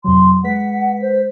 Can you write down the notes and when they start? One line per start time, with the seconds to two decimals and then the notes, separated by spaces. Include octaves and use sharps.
0.04 F2 C3 F#3 C6
0.44 G#3 B4 F#5 B6
1.02 C5